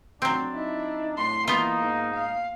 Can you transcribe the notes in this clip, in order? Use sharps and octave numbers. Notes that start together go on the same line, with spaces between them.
F1 F#3 C4 D4
D#4 E4
A2 C6
E3 A#3 B3 D#4 F4
G#2
F5